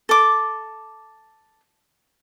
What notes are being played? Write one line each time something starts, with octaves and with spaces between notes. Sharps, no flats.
A4 D6